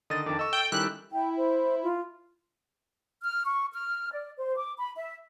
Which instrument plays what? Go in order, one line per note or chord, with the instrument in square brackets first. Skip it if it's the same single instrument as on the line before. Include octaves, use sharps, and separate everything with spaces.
[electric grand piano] D3 D#3 A6 [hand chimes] A4 [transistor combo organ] D#5
[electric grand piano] F2 D#3 [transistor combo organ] D4
[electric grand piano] D#5 C#6 [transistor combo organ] E6
[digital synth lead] G5
[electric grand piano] D#3 C#4 [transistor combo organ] G3 E4 [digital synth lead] F#6
[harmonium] E4 [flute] G5
[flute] C5
F4
[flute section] F6
C#6
F6
D5
C5
D6
B5
E5